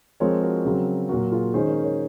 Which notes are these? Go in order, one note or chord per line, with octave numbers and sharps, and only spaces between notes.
F3 G#3 C4 A#4 C#5
F#4 A#4
C#3 F#3 C4
A#2 F#3 A#3 F#4 A#4
F4 G#4
D#3 G#3 C#4 G#4 C5
A#4 C#5
A#4 C#5